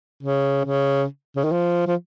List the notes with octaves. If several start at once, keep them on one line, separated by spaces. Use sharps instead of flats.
C#3
C#3
C#3
D#3
F3
F3